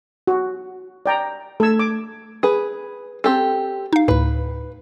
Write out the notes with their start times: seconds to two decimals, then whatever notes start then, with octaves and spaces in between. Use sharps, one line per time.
0.27 F#4
1.06 D5 G5 A#5
1.60 A3 A4 E6 G#6
1.79 D6
2.43 G#4 B4
3.24 C4 G4 A4
3.93 D#4 F5
4.08 D2 A2 B4